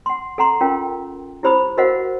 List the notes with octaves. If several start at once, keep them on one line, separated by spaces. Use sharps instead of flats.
F#5 C6
A4 F#5 A#5 C6
C#4 F4 A#4 G5
E4 G4 C5 B5 D#6
F#4 A#4 C5 D#5 F5 F#5